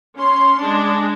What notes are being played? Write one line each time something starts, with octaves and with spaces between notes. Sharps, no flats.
C#4 C6
G#3 D4